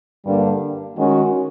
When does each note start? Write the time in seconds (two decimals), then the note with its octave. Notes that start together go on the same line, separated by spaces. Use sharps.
0.25 G2 D3 G3 A#3 D4
0.96 D#3 G#3 C#4 F#4